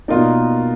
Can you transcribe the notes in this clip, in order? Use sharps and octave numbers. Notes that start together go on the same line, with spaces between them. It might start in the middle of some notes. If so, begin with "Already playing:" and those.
B2 A#3 D#4 F4 A#4 D5